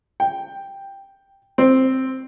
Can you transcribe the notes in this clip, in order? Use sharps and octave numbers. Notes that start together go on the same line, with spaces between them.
G5
C4